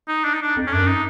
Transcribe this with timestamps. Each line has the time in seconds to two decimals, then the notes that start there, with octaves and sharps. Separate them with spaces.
0.08 D#4
0.25 D4
0.34 D#4
0.42 D4
0.57 F2
0.67 C#4
0.72 F#2 D4
0.88 D#4